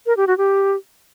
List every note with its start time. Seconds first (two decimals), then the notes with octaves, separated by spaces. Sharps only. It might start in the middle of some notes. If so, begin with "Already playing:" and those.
0.06 A#4
0.17 G4
0.27 F#4
0.38 G4